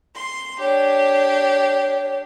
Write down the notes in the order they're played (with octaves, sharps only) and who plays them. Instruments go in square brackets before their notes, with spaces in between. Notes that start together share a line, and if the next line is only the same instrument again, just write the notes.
[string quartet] C6
[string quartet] D4 G4 [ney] C#5